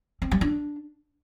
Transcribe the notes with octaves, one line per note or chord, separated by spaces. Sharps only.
C4
G3
D4